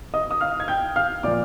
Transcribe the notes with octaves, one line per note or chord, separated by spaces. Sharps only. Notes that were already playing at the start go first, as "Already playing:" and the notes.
D#5 D#6
D#6
F5 F6
G#6
G5 G6
F5 F6
A#2 F3 D5 D6